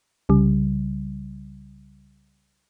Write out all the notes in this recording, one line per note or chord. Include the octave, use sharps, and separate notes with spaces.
C2 C#3 G3